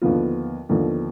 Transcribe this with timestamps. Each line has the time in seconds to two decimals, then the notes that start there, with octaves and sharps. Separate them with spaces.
0.02 D#2 D3 F3 B3 F4
0.69 D#2 D3 F3 B3 F4